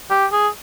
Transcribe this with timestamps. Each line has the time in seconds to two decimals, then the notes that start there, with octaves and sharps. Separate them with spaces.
0.10 G4
0.32 G#4